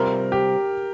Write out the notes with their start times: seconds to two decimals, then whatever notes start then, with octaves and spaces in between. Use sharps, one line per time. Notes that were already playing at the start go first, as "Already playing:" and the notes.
Already playing: C3 G3 C4 F4 A#4 C5
0.32 G4